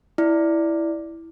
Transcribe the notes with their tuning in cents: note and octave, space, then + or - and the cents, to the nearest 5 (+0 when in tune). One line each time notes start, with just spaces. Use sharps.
E4 +0 D5 +0